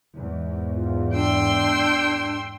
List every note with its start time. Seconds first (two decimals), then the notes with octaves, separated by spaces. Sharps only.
0.16 E2 G#2
0.75 F4
1.14 D4 G5 C6 E6